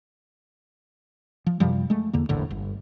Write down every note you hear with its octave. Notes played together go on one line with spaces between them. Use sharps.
F3
F#2 C3 F3 G3
G#3 A3
E2 D3 A#3
E1 A#1 A2 D3
G1